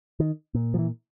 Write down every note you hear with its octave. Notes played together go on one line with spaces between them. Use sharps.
D#3
A#2
F3
E3